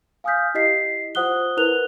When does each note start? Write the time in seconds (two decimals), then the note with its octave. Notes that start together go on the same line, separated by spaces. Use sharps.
0.24 F5 G#5 D#6 F6 G6 B6
0.54 E4 G4 D#5 B6 C7
1.15 F4 C5 F#5 D#6 F#6 G7
1.57 E4 A#4 B4 F#6 F7 G7